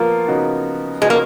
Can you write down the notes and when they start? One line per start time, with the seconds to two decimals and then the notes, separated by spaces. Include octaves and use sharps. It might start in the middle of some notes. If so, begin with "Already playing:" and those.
Already playing: F3 A#3 B3 F4
0.28 C#3 F3 B3 D#4 F#4
1.01 C#3 F3 G#3 B3 D#4 F#4
1.10 A#3